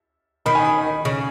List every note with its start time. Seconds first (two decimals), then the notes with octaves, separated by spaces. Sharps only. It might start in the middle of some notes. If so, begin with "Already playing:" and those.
0.46 D#3 B5
0.55 G#5
0.64 B5
1.05 C#3